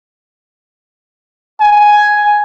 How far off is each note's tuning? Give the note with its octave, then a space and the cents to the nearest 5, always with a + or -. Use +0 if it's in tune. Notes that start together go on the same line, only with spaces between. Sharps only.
G#5 +5